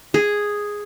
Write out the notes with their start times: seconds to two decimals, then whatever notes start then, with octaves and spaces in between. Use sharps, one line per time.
0.14 G#4